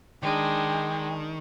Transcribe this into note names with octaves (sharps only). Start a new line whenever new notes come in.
D#3 G#3 D4 G5